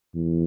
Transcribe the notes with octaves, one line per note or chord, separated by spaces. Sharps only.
E2